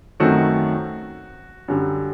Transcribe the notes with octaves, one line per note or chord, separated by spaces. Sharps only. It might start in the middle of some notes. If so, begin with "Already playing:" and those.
F#2 D#3 F#3 A3 C4 F#4
F#2 D3 G3